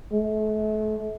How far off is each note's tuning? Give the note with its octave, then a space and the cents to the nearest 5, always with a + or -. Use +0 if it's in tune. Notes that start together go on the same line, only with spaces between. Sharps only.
A3 -40